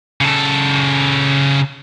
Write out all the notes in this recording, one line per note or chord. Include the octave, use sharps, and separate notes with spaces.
C#3 A4